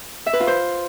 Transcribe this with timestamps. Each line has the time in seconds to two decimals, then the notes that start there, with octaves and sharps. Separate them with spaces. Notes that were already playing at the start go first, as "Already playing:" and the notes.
0.26 E5
0.33 B4
0.40 F4
0.47 C5